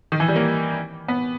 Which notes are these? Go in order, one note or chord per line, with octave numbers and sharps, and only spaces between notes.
D#3
E3
G3
A#3
B3